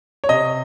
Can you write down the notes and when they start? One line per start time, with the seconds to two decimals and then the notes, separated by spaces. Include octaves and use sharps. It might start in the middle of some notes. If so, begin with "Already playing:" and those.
0.24 C#5
0.29 C3 D#5